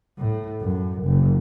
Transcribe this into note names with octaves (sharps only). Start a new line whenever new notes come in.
A2
F#2
F#1